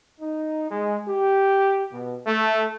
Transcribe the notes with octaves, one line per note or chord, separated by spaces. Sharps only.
D#4
G#3
G4
B2
A3